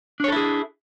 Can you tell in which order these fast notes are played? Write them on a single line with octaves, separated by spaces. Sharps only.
D4 C#5 A4 E4 G#4